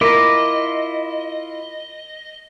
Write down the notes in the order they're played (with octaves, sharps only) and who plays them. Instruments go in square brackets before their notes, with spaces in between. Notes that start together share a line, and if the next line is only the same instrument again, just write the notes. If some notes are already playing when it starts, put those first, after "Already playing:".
[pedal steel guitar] E4 F4 [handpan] A#4 [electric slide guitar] D#5 [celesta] D6 A#6